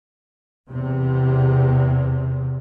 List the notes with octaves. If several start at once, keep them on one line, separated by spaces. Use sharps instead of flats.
E2 C3